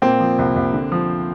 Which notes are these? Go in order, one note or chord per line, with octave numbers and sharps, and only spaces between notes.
A#2 A#3 C4
F3
C2
C2
D3
F3